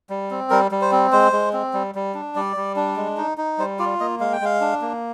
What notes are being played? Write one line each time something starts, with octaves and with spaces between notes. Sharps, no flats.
G3
C4
G3 A#4
G3
C5
C4
G#3 C5
G#3
C4
G3
G3
D4
G3 D5
G3
D4
G#3
D#4
D#4
G3 C5
F4 D5
A#3 D#5
G#3 F5
G5
G#3 F5
D4
A#3